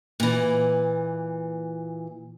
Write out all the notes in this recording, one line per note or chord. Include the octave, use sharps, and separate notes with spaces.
A#2 E3